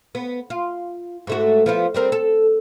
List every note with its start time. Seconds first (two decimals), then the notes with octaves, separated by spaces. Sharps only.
0.15 B3
0.50 F4
1.27 G#2 A3 F#4
1.66 F3 B3 F4
1.94 G3 C4 A#4
2.12 A4